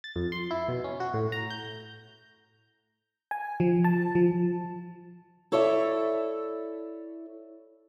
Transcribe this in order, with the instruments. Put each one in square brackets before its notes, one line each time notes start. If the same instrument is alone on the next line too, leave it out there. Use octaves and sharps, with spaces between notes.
[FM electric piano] A6
F2
C6
E4
B2
C#4
F#4
A2
A#5
G6
G#5
F3
A5
F3
[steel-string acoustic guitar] E4 A4 C#5 D5 E5